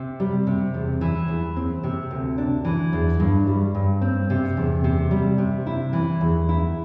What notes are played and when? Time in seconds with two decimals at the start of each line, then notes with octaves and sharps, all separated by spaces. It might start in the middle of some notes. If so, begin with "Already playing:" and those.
Already playing: C3
0.20 G3
0.47 C3
0.74 E2
1.01 E3
1.28 E2
1.56 C4
1.84 C3
2.11 D2
2.38 D4
2.65 E3
2.93 E2
3.20 G2
3.47 G3
3.75 G2
4.02 C4
4.30 C3
4.57 E2
4.84 C3
5.11 G3
5.38 C3
5.67 E4
5.93 E3
6.21 E2
6.49 E4